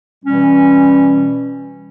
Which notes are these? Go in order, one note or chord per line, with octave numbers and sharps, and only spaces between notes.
B2 E3 G3 C#4